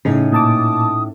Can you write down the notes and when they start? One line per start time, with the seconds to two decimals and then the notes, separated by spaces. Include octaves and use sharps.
0.05 A2 C#3 C#4 D#4
0.32 A#2 A5 D6 D#6